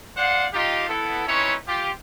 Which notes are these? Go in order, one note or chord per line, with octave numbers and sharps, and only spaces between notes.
C5 D5 F5 F#5
D#4 F4 G4
B3 E4 A4
C4 C#4 D#4 E4 B4 C#5
F4 G4